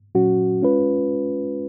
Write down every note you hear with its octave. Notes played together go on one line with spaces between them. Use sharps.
A#2 F#3 C#4 F#4
G#3 C#4 F4 B4